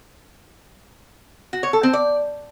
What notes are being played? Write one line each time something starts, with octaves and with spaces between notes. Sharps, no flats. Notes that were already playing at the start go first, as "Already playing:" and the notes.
F#4
C#5
A4
C4
D5